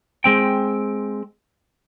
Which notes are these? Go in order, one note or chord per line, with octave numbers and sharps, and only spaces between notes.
G#3 C4 G5